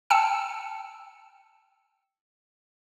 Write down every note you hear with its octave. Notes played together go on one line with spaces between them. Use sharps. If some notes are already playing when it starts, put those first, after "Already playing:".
G5 A5 E6 C#7